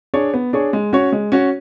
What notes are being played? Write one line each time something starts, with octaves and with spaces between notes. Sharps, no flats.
D4 G#4 C#5
B3
D4 G#4 C#5
G#3
C#4 F#4 C#5
G#3
C#4 F#4 C#5